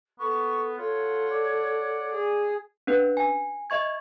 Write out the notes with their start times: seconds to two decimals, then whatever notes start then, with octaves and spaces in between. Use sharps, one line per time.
0.19 B3 A4 C#6
0.78 F4 A4 C#5 F#5
1.31 D5
2.12 G#4
2.87 C#4 D4 B4
3.17 G#5
3.70 D#5 E5 C#6 G#6